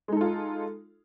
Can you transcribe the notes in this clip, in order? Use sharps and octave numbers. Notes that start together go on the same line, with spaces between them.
G#3 D#4 F4 A4